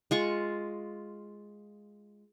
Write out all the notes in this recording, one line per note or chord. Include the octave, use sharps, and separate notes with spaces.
G#3 F4 C#6